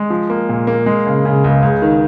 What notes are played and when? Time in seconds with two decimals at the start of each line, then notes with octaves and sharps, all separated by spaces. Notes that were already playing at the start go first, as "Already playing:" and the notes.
Already playing: G#3
0.10 F3
0.30 A#3
0.49 A#2
0.67 A#3
0.86 G#3
1.07 C#3
1.25 C#3
1.44 C#2
1.63 C#2
1.82 D#3